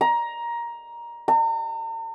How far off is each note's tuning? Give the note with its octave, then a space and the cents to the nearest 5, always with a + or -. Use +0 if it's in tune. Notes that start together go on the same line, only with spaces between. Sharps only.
A#5 +15
A#5 -45